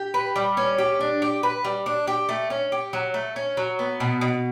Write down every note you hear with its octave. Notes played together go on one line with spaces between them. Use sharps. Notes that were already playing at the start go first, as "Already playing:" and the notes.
Already playing: G4
B4
G3
C#4
G4
D4
G4
B4
G3
D4
G4
A3
C#4
G4
F#3
A3
C#4
F#3
B3
B2
B2